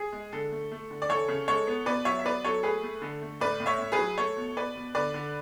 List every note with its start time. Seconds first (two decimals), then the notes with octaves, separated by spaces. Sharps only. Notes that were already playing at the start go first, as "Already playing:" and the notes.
Already playing: G#4
0.12 G#3
0.33 D3 A4
0.52 A3
0.72 A3
0.91 D3
1.02 D5
1.09 E3 A4 C#5
1.28 C#3
1.48 G#3 A4 C#5
1.67 B3
1.86 B2 B4 D5
2.05 F#3 C#5 E5
2.19 E5
2.24 B3 B4 D5
2.45 F#3 A4 C#5
2.63 A3 G#4 B4
2.83 A3
3.02 D3 A4
3.22 A3
3.40 A2 B4 D5
3.60 A2
3.66 C#5 E5
3.79 A2
3.92 G#4 B4
3.99 F#3
4.18 A3 A4 C#5
4.36 B2
4.57 B2 B4 D5
4.75 B2
4.95 D3 B4 D5
5.14 D3